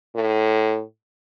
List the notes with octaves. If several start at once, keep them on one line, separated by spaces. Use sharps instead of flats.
A2